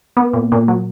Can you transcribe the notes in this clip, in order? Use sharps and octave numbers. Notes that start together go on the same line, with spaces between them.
B3
A#2
A#2
F#3